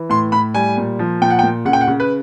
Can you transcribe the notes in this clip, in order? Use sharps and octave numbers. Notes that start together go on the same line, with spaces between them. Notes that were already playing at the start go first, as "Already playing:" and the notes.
Already playing: E3
A2 C6
A2 B5
G3 G#5
A#2
F3
A#2 G5
F#5
G5
A#2
C#3 F#5
G5
F#5
C#3
B4